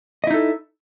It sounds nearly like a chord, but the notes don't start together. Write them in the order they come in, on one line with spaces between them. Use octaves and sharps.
D#5 E4 D#4 A4